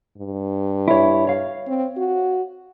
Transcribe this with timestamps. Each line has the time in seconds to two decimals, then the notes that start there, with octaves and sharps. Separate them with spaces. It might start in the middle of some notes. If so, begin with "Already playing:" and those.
0.18 G2
0.88 E4 C#5
1.27 C#5 F5
1.67 C4
1.97 F#4